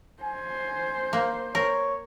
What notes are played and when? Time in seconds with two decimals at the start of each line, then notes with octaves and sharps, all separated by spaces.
0.23 C5 G#5
1.13 A#3
1.55 A#4 C#5